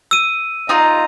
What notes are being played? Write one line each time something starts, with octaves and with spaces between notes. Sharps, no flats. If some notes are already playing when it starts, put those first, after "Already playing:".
E6 D#7
D#4 F4 A#5